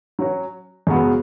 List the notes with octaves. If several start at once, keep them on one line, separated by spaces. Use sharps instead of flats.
F#3 C#4 F#4
F#2 C#3 G#3 B3 F#4